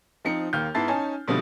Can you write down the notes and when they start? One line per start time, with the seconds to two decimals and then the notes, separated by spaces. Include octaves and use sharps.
0.25 F3 C4 D#4 C#7
0.53 D#2 A#3 F6 G6
0.75 G#2 B3 E4 A5 A6 C7
0.88 C#4 D#4 G#5 A5
1.28 B2 D3 F3 G3 A3 C4